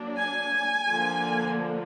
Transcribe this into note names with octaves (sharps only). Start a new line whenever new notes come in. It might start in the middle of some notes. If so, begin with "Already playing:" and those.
Already playing: F#3 A#3 D4
G#5
D3 F3 A#3 D4